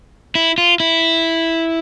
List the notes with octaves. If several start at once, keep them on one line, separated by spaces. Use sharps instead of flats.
E4
F4
E4